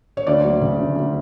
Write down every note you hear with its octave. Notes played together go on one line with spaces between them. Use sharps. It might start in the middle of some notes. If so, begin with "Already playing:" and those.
C#5
D2 D5
F#3
C#3
D2
D2